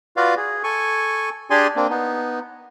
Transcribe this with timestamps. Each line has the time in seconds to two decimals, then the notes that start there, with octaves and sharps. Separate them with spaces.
0.17 F4 F#4 B4 D5 F5
0.37 G#4
0.64 A4 G#5 C#6
1.50 D4 G4 G#4 D5 G#5 C6
1.76 A#3 C4 D4
1.90 B3 D#4